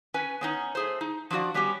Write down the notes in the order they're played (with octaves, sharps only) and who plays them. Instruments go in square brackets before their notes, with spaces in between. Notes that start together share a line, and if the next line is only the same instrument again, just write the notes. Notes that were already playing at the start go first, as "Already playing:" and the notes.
[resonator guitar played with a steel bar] C#4 B4 G#5
B3 C#4 D#4
A3 G#4 C5
D#4
F3 D4 E4 F#4 D5
G3 B3 C#4 F#4 G4